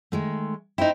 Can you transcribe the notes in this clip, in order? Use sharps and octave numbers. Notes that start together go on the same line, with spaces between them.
D#3 G#3 A3
D#4 E4 C5 G5